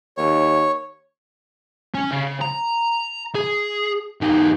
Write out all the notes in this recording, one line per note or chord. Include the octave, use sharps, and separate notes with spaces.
D#2 C#5
C#4
C#3
A#5
G#4
E2 D#4